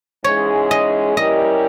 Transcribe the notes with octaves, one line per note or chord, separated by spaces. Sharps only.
G#2 E3 G#3 C#4 G#4 C#5
D#5
G3 C#4 E4 G4 A#4 D#5